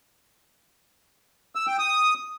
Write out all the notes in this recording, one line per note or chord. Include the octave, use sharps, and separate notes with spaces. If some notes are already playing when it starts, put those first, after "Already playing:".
E6
G5
D#6